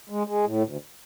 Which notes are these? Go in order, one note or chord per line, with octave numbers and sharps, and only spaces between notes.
G#3
G#3
A2
D2